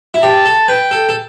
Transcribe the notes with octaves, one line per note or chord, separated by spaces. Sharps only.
E4
G4 A5
A4
B4 G5
A4
A4